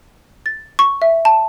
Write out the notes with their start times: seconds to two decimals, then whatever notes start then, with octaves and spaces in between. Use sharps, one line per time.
0.46 A6
0.79 C#6
1.02 E5
1.25 A5